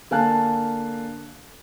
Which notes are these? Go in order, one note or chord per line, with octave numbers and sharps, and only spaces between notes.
D3 A#3 F5 G#5 A5 F#6